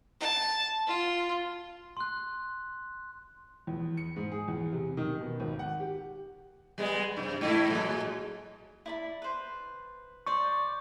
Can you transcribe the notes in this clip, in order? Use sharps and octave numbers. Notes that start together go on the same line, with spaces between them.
A5
F4
C6 F#6
E2
C#7
G#2
G#4
E2
C3
D#3
B2
G#1
F#5
G4
G3 G#3 B3
F#2 C3
G#2 A3 E4
A2 F#3 G#3
E4 D5 B5
B4 C5
C5 D5 C#6